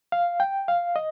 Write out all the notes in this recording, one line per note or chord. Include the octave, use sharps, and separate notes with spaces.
F5
G5
F5
D#5